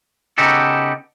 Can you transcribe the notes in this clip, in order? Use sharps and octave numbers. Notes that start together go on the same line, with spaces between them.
C#3 B3 D#4 F#4 G4 A4